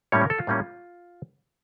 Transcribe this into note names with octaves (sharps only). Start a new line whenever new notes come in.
A2 G3 A#3 C#4 C#5
A#4
A4
F4
A2 G3 A#3 C#4